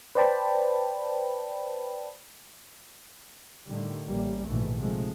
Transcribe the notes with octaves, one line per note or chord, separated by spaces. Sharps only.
B4 C5 D5 G5 A5 B5
A2 D3 D#3 G3
A1 G3 A#3
A#1 G#2 B2 D#3 E3 A3
C3 D#3 F3 G#3 A3